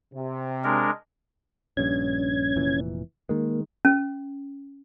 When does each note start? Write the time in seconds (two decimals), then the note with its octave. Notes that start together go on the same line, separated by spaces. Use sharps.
0.14 C3
0.64 G#3 D4 A#4
1.77 A#1 G2 C#4 G#6
2.56 F1 A#2 E3
3.29 D#3 G#3 A#3
3.85 C#4